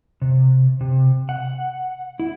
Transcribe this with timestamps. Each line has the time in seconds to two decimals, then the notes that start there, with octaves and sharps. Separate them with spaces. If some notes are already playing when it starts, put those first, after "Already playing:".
0.22 C3
0.81 C3
1.29 F#5
2.19 E4